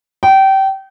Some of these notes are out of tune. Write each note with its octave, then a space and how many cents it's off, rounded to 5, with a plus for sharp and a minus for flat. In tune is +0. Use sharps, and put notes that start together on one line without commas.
G5 -25